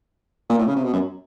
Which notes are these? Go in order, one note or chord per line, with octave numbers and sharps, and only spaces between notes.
A#2
A2
C#3
C3
B2
F#2